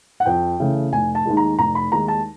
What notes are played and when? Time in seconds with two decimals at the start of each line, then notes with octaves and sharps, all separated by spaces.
0.20 F#5
0.26 F2 G5
0.60 C#3 E3 A3
0.92 F1 G#5
1.15 A5
1.25 D#2 D#3 G#3
1.37 A#5
1.59 F1 A#5
1.75 B5
1.92 D#2 D#3 G#3 A#5
2.08 A5